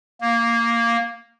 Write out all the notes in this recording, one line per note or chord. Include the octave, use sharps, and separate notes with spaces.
A#3